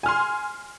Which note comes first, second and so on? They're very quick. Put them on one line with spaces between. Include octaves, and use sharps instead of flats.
G#5 F6 C6